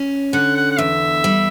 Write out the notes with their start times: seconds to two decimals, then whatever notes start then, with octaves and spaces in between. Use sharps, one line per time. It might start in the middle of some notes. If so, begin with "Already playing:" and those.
Already playing: C#4
0.33 D3 F#5
0.56 F#5
0.72 F#5
0.78 E2 E5
1.24 G3